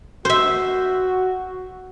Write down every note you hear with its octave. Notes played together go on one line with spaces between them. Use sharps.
F#4 C5 E5